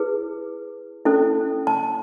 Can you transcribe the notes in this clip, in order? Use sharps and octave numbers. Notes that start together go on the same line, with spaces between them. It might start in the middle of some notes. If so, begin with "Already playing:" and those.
Already playing: E4 G#4 B4
C#4 E4 A4
A5